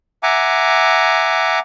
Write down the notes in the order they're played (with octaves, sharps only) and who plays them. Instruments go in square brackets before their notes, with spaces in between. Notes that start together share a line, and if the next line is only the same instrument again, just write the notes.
[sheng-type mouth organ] E5 F#5 G#5 A#5 D6